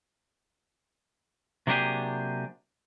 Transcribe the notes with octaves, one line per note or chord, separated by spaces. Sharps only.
C3 F#3 A#3 D4 G4 G#4